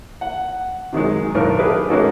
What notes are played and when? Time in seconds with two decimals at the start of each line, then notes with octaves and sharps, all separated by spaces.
0.21 F#5
0.93 C3 D#3 F#3 G#3
1.35 B1 A2 D#3 B3 D4 A#4
1.59 G4 G#4 B4
1.88 G#3 A#3 C#4 D#4 F#4 A4